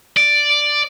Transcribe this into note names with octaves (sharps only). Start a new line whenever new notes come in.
D5